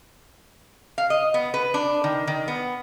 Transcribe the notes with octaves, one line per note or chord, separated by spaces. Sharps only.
F5
D#5
B3
B4
D4
D#3
D#3
B3